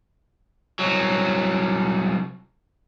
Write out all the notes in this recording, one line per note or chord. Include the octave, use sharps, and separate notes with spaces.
C2 F#3